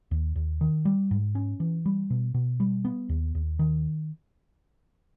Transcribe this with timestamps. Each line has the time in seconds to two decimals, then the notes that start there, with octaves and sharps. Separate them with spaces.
0.11 D#2
0.36 D#2
0.61 D#3
0.85 G3
1.11 G#2
1.35 C#4
1.60 E3
1.86 G3
2.10 B2
2.34 B2
2.60 G3
2.85 B3
3.09 D#2
3.35 D#2
3.59 D#3